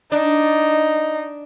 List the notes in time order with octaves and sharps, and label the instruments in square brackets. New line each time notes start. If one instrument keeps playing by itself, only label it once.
[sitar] D4 [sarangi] D#4